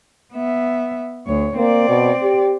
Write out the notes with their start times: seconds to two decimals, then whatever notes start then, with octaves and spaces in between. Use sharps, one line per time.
0.33 B3 E5
1.27 D2 C#5
1.57 A#3 C4 D5
1.89 B2
2.23 G4